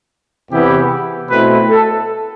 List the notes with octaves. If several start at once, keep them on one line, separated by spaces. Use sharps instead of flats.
E2 C3 E3 B3 E4 G4
B2 A3 C4 E4 B4
A4